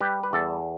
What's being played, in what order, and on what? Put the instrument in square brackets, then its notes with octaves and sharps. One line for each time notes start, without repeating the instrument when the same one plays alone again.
[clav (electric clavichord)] G3 G4 B4
B4
E2 A4 D5